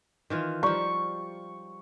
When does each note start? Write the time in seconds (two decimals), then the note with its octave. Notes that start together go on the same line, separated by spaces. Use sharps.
0.30 D#3 E3 F4
0.63 F3 G3 C#6